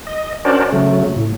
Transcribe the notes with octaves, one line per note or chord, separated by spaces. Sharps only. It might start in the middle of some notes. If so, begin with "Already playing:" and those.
D#5
C#4 D4 F#4 A#4 C5 D5
C#3 F#3 A3
A2